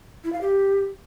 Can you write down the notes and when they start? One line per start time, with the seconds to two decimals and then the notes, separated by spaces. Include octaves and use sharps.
0.24 E4
0.33 F5
0.41 G4